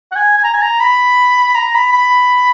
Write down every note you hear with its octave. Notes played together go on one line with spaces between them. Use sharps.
F#5
G#5
G#5
A#5
G#5
A#5
B5
A#5
B5
B5